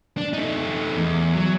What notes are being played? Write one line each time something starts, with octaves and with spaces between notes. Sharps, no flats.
D4
A3 D#4
E2
F#3